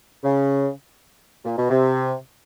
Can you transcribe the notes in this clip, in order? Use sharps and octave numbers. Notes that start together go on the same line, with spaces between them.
C#3
A#2
B2
C3